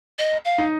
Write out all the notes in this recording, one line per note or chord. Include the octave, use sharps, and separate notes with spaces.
D#5
F5
D#4